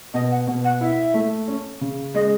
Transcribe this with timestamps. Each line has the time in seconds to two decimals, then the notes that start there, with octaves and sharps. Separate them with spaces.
0.14 B2 D#5
0.31 F#5
0.47 B2
0.64 F#5
0.81 E4 E5
1.14 A3
1.48 C#4
1.81 C#3
2.15 G#3 D#5